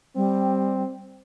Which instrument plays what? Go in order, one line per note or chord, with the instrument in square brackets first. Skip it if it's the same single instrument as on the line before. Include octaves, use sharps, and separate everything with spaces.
[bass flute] G3 [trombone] C4